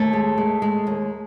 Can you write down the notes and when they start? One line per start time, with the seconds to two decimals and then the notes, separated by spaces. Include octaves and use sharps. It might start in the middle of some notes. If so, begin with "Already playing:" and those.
Already playing: D#2 A3 A4
0.13 G#3
0.38 G#3
0.62 G#3
0.87 D#2